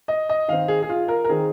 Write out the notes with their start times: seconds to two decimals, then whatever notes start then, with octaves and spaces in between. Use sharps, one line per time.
0.08 D#5
0.29 D#5
0.48 D#3 C4 F5
0.68 G#4
0.83 G#4
0.89 F4
1.08 A#4
1.24 A#4
1.29 D#3 C4 G#4